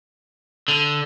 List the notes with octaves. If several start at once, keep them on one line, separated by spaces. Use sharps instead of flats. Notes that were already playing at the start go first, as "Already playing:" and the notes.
D3